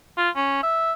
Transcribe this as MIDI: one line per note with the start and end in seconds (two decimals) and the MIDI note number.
0.17 0.30 65
0.36 0.61 61
0.63 0.92 76